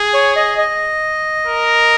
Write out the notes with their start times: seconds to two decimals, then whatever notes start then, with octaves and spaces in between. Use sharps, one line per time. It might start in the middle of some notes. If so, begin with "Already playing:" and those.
Already playing: G#4
0.14 C#5
0.36 D#5
0.58 D#5
1.47 A#4